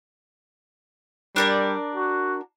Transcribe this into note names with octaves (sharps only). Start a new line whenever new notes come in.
G3 D4 A#4 D5
F#4